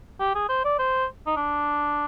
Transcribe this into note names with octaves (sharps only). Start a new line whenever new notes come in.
G4
G#4
C5
D5
C5
D#4
D4